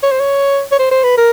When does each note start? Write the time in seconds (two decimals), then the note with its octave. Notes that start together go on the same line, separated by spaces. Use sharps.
0.03 C#5
0.11 C5
0.20 C#5
0.72 C#5
0.79 C5
0.91 C5
1.03 B4
1.17 A#4